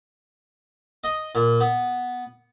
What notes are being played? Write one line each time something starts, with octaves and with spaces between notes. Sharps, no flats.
D#5
A#2
B3